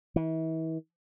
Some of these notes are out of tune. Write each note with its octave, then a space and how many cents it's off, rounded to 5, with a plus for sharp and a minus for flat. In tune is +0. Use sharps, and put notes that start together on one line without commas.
E3 -40